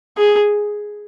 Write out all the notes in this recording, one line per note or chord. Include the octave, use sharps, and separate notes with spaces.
G#4